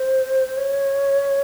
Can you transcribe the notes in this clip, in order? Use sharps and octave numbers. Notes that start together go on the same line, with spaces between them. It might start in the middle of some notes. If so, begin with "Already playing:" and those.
Already playing: C5
C#5